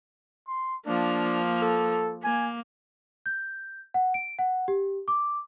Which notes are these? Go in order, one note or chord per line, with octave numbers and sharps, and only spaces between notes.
C6
F3 A#3 D4
A4
A#3 G#5
G6
F#5
D7
F#5
G4
D6